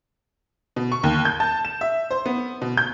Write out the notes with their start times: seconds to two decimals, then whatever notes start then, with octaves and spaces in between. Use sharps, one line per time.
0.76 B2
0.92 C#6
1.03 D#2
1.25 G6
1.40 A5
1.65 E7
1.81 E5
2.11 C5
2.26 B3
2.62 B2
2.78 G6